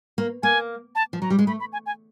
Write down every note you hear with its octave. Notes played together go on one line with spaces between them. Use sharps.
A#3
A#3 G#5
A5
F3
F#3 A#5
G3
G#3
A3 B5
B5
G#5
G#5